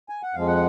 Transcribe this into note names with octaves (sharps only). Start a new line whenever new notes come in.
G#5
F#5
F2 F3 G#3 F5
F#5